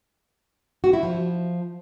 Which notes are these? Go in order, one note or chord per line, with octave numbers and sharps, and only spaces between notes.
F#4
E4
F3